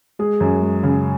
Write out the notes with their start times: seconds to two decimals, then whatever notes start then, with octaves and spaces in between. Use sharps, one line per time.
0.19 G#3 G#4
0.40 F#2
0.62 G#3
0.83 C#3